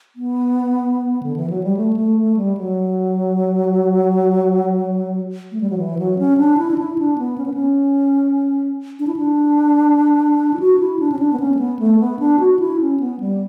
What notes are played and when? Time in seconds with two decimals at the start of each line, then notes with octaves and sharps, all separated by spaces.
0.16 B3
1.23 D3
1.36 E3
1.50 F#3
1.63 G3
1.77 A3
1.93 G3
1.97 A3
2.17 A3
2.37 G3
2.57 F#3
5.52 A3
5.61 G3
5.70 F#3
5.78 E3
5.99 F#3
6.19 C#4
6.38 D4
6.58 E4
6.71 D4
6.78 E4
6.98 D4
7.18 B3
7.38 C#4
7.46 B3
7.54 C#4
8.99 D4
9.07 E4
9.16 D4
10.54 E4
10.60 F#4
10.80 E4
10.99 D4
11.12 C#4
11.19 D4
11.33 B3
11.40 C#4
11.55 A3
11.59 B3
11.79 A3
12.00 B3
12.19 D4
12.40 F#4
12.59 E4
12.81 C#4
13.00 B3
13.20 G3